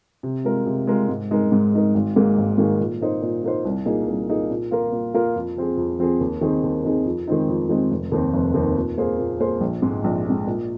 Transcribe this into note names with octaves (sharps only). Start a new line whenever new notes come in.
C3
G#3 F4 A#4
C3
G#3 F4 A#4
G#2
G#3 D#4 A#4
G#2
G#3 D#4 A#4
G#1
G#2 D#3 A#3 G#4
G#1
G#2 D#3 A#3 G#4
A#2
A#3 D#4 C5
A#2
A#3 D#4 C5
C2
A#2 A#3 D#4 G#4
C2
A#2 A#3 D#4 G#4
A#2
A#3 F4 A#4
A#2
A#3 F4 A#4
F2
F3 C4 G#4
F2
F3 C4 G#4
D#2
D#3 C4 D#4 G#4
D#2
D#3 C4 D#4 G#4
F2
D#3 G#3 C4 D#4
F2
D#3 G#3 C4 D#4
F1
D#2 D#3 C4
F1
D#2 D#3 C4
A#2
A#3 G#4 C5
A#2
A#3 G#4 C5
A#1
G#2 G#3
A#1
G#2 G#3
A#2